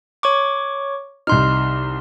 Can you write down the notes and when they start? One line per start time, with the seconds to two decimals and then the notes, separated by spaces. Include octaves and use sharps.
0.23 C#5 C#6 D6
1.27 C2 D#4 C6 F6